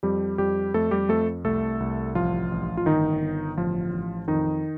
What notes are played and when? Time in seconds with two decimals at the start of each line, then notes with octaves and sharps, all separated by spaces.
0.03 F2 G3 G4
0.38 F2 G3 G4
0.74 F2 A3 A4
0.91 G3 G4
1.09 F2 A3 A4
1.45 C2 A3 A4
1.80 C2
2.15 A1 F3 F4
2.51 A1
2.77 F4
2.86 G1 D#3 D#4
3.22 G1
3.57 A1 F3 F4
3.93 A1
4.28 F2 D#3 D#4